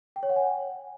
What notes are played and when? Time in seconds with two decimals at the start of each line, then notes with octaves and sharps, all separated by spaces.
0.16 G5
0.23 C#5
0.29 F#5
0.36 G#5